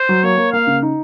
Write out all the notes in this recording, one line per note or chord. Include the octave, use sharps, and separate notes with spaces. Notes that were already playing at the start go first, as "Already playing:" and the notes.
Already playing: C5
F#3
A#3 C#5
A#3
A#3 F5
C#3
D#4